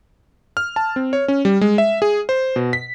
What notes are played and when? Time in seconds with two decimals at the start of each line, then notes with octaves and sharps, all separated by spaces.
0.57 F6
0.76 A5
0.96 C4
1.13 C#5
1.28 C#4
1.45 G3
1.61 G#3
1.78 E5
2.02 G#4
2.29 C5
2.56 B2
2.73 B6